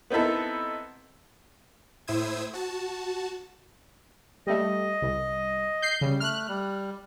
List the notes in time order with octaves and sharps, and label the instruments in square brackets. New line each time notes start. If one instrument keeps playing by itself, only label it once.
[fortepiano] B3 C4 D#4 E4 A4
[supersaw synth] A2 E4 C5 D#6 E6 G#6
F#4 A5
[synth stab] G3 A3 [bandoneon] D#5
[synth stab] C2
G6 C7
[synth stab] C#3 [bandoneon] G3
[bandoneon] A3 [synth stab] F6 F#6
[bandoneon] G3